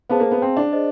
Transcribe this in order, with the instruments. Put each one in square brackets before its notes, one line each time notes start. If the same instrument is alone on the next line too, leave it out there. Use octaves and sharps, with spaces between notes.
[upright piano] B3 [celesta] G#4 C5 F5 A5
[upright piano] A#3
B3
C4
D4
[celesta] G#4 C5 D#5